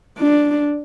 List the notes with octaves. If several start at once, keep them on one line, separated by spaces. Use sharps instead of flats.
D4